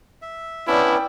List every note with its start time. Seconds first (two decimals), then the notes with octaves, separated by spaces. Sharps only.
0.22 E5
0.68 B3 C#4 D4 E4 B4 D5 G5